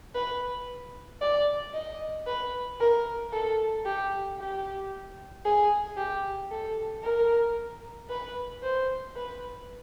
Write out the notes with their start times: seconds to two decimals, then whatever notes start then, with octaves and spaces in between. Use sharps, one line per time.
0.15 B4
1.21 D5
1.74 D#5
2.27 B4
2.80 A#4
3.33 A4
3.86 G4
4.39 G4
5.45 G#4
5.97 G4
6.51 A4
7.03 A#4
8.09 B4
8.63 C5
9.16 B4